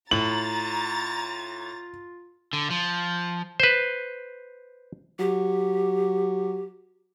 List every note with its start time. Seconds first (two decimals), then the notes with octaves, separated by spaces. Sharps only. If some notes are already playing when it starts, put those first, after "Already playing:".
0.11 A2 F4 A#5 A6 F#7
2.53 D3
2.70 F3
3.60 B4 C5
5.19 F#3 G4